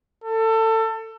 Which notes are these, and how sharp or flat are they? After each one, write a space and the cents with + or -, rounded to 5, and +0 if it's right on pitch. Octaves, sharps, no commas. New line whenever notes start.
A4 +25